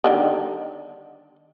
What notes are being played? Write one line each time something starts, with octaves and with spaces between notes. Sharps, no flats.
D3 D#3 G3